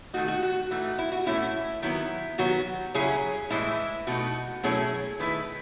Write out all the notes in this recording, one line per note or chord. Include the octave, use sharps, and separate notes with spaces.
D#3 A3 D#4 F#4
F#4
F#4
E3 A3 D#4
E4
F#4
A2 E3 A3 C#4 E4
D#3 F#3 B3 E4
D#3 F#3 B3 F#4
C#3 F#3 C#4 E4 G#4
A2 E3 G#3 E4
B2 A3 D#4 F#4
B2 F#3 A3 C#4 E4 G#4
D#3 A3 E4 B4